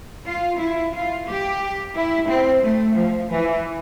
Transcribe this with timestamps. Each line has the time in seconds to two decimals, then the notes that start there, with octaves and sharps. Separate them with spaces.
0.27 F4
0.60 E4
0.94 F4
1.28 G4
1.95 E4
2.28 C4
2.63 A3
2.96 F3
3.30 E3